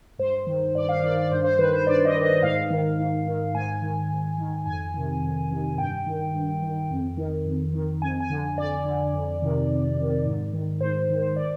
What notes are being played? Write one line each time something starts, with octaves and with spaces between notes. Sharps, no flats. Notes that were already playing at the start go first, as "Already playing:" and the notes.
G2 C5
D#3
G2 D5
F5
D#3 D5
D5
G2 C5
C5
D#3 B4
C5
G2 D5
D#5
D#3
D#5
G#2 F5
D#3
G#2
D#3
G#2 G#5
D#3
G#2
D#3
F2 G#5
C3 D#3
F2
C3 D#3
G2 G5
D#3
G2
D#3
F2
D#3
F2
D#3
F2 G#5
G#5
D3
F2 D5
D3
F2
C3 D#3
F2
C3 D#3
G#2
D#3
G#2 C5
D#3
C5
D5